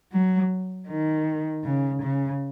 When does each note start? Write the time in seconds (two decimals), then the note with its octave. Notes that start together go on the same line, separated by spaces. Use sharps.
0.12 F#3
0.88 D#3
1.64 C#3
2.02 C#3